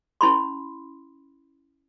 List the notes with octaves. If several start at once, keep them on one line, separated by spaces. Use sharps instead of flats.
C#4 E4 B5 C6